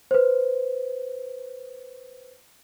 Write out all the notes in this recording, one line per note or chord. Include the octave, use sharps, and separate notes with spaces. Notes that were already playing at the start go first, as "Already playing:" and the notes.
B4 C5